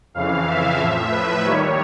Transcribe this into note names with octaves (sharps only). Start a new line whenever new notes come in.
F2 C#3 E3 F5
E5
A2 F3
B4
D#2 D#3 G3 C#5